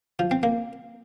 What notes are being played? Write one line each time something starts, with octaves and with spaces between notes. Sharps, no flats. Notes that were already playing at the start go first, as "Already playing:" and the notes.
F3
C4
A#3